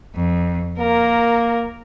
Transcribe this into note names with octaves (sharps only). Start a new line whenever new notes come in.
F2
A#3 A#4